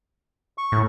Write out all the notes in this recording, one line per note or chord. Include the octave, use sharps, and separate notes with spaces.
C#6
A2